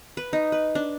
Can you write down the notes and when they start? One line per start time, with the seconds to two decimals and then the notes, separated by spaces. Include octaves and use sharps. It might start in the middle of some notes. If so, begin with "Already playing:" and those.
0.17 B4
0.33 D#4
0.52 B4
0.75 D4